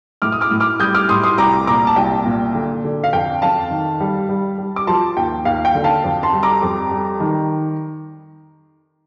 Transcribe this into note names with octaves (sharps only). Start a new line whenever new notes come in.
A2 D6 F6
D#6
D6 F6
A2
D6 F6
G3 D#6 G6
D6 F6
A2 C6 D#6
C6 D#6
C2 A#5 D6
A#2 A#5 D6
A5
C2 G5
A#2
D3
D3
F5
F2 G5
F2 F5 A5
D#3
G3
G3
G3
D6
F3 A5 C6
D#2 G5
D#2 F5
G5
D3
F5 A5
F2
A5 C6
G3
A#5 D6
F2
G3
D#3